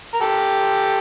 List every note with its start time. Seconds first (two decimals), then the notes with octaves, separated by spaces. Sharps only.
0.14 A#4
0.21 G4 A4